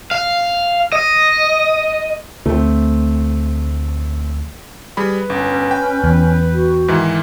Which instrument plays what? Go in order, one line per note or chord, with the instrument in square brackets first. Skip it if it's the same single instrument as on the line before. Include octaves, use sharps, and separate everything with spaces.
[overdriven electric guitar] F5
D#5
[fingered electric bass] D2 [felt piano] A3 C4
[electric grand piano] G3 G#4 B5 [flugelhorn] B4
[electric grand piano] G1 [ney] C#4
[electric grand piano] G5
[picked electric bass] E2
[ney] F#4
[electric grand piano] G#2 D#3 E3